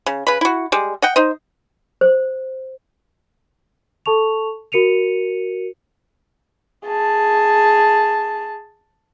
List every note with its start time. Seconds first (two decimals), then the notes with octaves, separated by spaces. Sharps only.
0.06 C#3
0.27 C#3 B4 B5
0.41 E4 F#4
0.72 G3 G#3
1.02 D#5 F#5 G5
1.16 D#4 C5 D#5
2.01 C5
4.06 A4 A5 C#6 F7
4.72 F#4 A#4 C#7 D#7 F7
6.85 G#4 A5